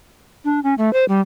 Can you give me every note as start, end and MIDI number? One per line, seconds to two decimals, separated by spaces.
0.45 0.60 62
0.64 0.74 61
0.78 0.92 57
0.93 1.05 72
1.08 1.21 55